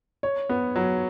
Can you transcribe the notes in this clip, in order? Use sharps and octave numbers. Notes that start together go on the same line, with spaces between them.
C#5
B3
F#3